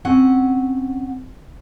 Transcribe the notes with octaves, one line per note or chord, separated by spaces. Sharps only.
C4 C#4 F#5